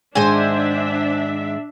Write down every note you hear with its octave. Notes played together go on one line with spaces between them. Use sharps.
G#2 D#3 G#3 D4 C5 E5 G#5